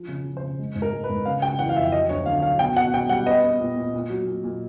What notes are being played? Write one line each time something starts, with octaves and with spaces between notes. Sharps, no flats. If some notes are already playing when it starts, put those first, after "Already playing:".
Already playing: F3
C#3
F3
C5
C#3
G#3
G#2
A#4
G#3
B4
G#2
C#3 F5
C#3 G5
E3 F#5
F5
F2 E5
F#3 D#5
D2 C#5
D3 F5
F#3 F5
B2 G5
B2 F#5
B2 G5
G3 F#5
B3 D#5
B3
A#2
A#2
A#2
F#3
A#2
A#2